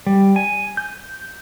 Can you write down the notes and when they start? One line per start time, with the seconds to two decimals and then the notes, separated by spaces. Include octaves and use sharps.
0.06 G3
0.36 G#5
0.77 G6